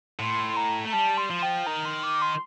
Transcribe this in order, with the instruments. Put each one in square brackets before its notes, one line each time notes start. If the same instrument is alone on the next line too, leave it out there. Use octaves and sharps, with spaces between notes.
[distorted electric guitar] A2 [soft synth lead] C6
[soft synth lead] A#5
[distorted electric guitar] A3 [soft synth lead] A#5
[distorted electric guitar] G3 [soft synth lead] A5
[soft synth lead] C6
[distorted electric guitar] F3
[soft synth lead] G5
[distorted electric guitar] D#3 [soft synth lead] A#5
[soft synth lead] C6
D6
C6